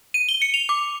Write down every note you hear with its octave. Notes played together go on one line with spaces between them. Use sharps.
D#7
G7
C#7
F7
D6